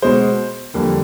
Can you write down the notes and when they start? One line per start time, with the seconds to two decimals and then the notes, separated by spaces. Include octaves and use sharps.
0.02 B2 G#3 C5
0.74 F2 D3 G3 A#3